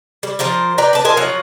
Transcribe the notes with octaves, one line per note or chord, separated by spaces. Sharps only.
G3
F3 F4 A#4 C5
B4 D5 G5 A#5
B4 A5
A#4 C5 D#5 G#5
F3 F#3 F4 F#5